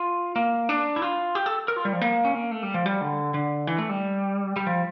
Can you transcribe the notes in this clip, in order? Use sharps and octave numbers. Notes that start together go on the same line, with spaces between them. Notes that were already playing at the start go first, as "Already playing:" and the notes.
Already playing: F4
A#3
D4
E4
F4
G4
A4
A#4
F4
G3
F3
A#3
C#4
A#3
A3
G3
F3
G3
D3
D3
E3
A3
G3
G3
F3